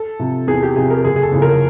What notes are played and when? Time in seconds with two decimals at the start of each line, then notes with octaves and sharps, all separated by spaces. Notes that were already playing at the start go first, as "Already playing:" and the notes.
Already playing: A4
0.20 C3 F3
0.47 E2 G#4
0.63 G4
0.76 C3 F3 G#4
0.90 A#4
1.04 F#1 G#4
1.16 G#4
1.23 A4
1.32 E2 C#3 F3
1.42 A#4